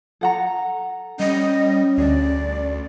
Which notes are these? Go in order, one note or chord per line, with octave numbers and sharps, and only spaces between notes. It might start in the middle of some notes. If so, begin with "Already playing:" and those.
A4 F#5 A#5
G3 C#4 D#5
D2 G#4 D5